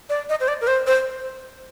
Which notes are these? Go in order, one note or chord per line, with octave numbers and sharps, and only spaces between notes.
D5
D#5
C5
D5
A#4
C5
C5